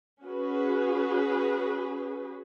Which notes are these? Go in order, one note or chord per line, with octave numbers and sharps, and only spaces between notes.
C#4 F#4 G#4 B4